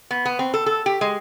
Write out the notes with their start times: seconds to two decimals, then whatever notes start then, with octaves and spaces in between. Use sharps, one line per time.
0.11 B3
0.26 B3
0.39 C4
0.54 A4
0.66 A4
0.86 G4
1.01 G#3